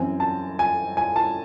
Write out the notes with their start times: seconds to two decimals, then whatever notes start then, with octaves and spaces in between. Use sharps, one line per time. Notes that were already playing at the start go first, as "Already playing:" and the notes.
Already playing: F#2 E3 C4 G#5
0.20 A5
0.59 G#5
0.97 G#5
1.16 A5